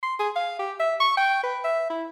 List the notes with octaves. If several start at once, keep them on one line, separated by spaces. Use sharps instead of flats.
C6
G#4
F5
G4
E5
C#6
G5
B4
E5
E4